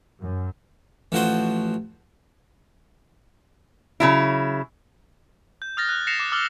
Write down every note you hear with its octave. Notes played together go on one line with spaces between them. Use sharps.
F#2
A1 F3 F#4 C5
C#3 F#3 E4
G6
D#6 F6 A6 A#6
F#6
A#6 C7 C#7 E7 F7
D6
D6 E6 F6 A6 G7